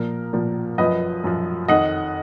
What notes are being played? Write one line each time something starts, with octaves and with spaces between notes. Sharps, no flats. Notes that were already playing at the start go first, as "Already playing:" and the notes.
Already playing: A#2 F3 A#4
A#2 F3
F#2 F3 B4 D#5
F#2 F3
F2 D#3 D#5 F#5